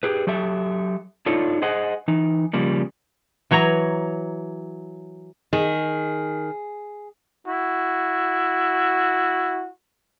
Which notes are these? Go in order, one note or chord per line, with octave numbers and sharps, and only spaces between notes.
G4 G#4 B4
F#3 G4 A4 E5
D4 D#4 F4 A4 C#5
G#4 C5 D#5 F#5
E3 D#4
C#3 F3 G3 A#3
E3 F#3 C#5 A#5
D#3 G#4
E4 F#4